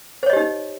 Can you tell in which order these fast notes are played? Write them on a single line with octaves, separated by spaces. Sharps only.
C5 C#5 D#5 G4 D#4